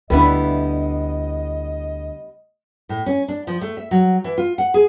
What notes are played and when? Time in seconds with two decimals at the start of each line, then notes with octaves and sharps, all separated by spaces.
0.10 D2 G3 B3 D4 E4 B4 D#5
2.89 A2
3.06 C#4
3.28 D4
3.47 F3
3.61 A3
3.77 E5
3.91 F#3
4.24 E3
4.38 F4
4.58 F#5
4.74 G#4